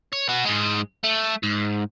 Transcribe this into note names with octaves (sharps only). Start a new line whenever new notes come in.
C#5
B3 F#4
G#2 G#3
A3
G#2